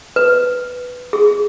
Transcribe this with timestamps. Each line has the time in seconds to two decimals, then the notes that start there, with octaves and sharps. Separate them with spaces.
0.16 B4
1.13 G#4